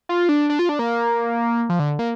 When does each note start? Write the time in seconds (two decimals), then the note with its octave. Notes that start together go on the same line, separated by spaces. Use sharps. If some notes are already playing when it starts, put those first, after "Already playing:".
0.09 F4
0.29 D4
0.50 D4
0.59 F4
0.69 D4
0.79 A#3
1.69 F3
1.79 D3
1.99 A#3